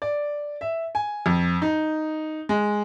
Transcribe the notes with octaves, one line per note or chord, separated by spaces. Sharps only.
D5
E5
G#5
F2
D#4
G#3